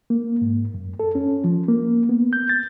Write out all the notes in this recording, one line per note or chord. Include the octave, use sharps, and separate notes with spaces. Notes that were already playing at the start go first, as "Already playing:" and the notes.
A#3
G#2
F#2
A4
C#4
F3
A#3
B3
G6
A6